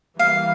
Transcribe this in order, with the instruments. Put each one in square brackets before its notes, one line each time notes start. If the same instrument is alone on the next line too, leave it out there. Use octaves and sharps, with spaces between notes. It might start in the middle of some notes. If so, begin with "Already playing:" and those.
[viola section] E3 G3 A#3 [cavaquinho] F5